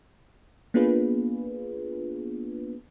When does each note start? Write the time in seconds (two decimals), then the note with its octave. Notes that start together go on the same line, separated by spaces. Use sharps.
0.74 A#3 B3 D4 F4 G#4 B4